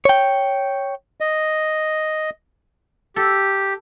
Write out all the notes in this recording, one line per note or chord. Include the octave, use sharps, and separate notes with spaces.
C#5 G5
D#5
G4 A4